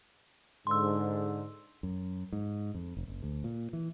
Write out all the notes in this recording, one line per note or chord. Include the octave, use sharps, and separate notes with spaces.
G#2 D3 C6 E6
F#2
G#2
F2
F1
F#1
D2
A#2
E3